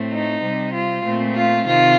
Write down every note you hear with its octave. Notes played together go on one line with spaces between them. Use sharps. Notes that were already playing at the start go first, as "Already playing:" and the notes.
Already playing: A2 A3 C4
D#4
C3 G3 C4
F4
A#2 A3 C4
F4
C3 D#3 F4